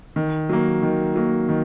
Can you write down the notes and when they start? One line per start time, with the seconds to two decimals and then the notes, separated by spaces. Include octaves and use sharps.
0.16 D#3
0.49 F#3 A#3
0.82 D#3
1.16 F#3 A#3
1.49 D#3